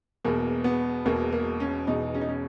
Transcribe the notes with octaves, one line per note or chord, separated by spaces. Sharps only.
E1 E2 B2 A#3
B3
E1 E2 B2 A#3
A#3
C#4
E1 E2 B2 D#4
C#4
D#4
C#4